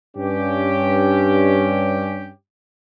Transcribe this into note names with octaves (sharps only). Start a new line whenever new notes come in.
G2 C#4 G4